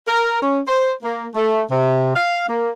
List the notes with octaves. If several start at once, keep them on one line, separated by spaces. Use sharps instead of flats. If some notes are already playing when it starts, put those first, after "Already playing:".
A#4
C#4
C5
A#3
A3
C3
F5
A#3